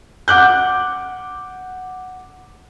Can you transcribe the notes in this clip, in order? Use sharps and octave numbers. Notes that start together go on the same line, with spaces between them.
F#5 D6 F#6 G6